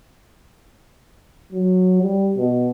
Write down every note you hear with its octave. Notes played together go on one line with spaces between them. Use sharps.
F#3
G3
B2